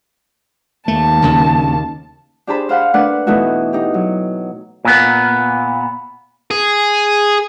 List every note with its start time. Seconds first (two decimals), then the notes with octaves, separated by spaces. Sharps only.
0.88 D#2 A3 A5
1.22 D#1 D2 C#3
2.47 D4 G4 G#4 C5 A5 B5
2.69 C5 F5 F#5 B5
2.94 A3 A#3 D4 B4 D5 F#5
3.27 B2 E3 A3 B3 D#4 F#4
3.73 D#4 G4
3.94 F#3
4.85 A#2 B3
6.51 G#4